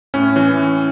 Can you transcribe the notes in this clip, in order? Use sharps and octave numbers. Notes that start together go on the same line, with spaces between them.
A2 C#4
E3 C#4